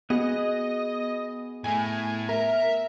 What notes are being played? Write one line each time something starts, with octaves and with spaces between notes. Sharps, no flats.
B3 F#4 G#4 D#5
A2 A3 G#5
A#4 E5